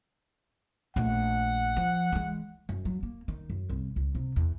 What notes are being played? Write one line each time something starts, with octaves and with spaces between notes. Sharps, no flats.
A#1 A3 F#5
F3
E3 G#3
F#2
F#3
A#3
D#3
F#2
C2
C#2
C3
E2